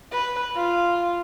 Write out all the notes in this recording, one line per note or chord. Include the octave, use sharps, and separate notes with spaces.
B4
F4